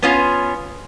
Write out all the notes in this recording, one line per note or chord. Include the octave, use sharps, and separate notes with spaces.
B3 C#4 F4